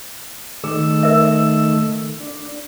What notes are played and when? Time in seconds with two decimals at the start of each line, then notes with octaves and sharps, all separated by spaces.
0.64 D#3 A3 G#4 E6
1.03 A#4 E5
2.21 D4